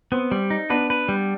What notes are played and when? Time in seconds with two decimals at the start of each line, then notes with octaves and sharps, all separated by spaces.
0.12 B3 C4
0.32 G3
0.50 D#4
0.70 B3 D4 B4
0.90 B4
1.09 G3